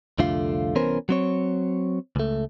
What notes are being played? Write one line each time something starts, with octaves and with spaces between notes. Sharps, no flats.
C2 F2 D3 A3 F4 F5
C2 E3 B3 C#4 A#4 C5
F#3 C4 C#5
C#2 A3